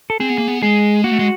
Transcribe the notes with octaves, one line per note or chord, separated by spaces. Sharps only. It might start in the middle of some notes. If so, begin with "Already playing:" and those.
A4
C4 G#4
B3
A#3
B3
G#3 G#4
A#3 F#4
A3
G#3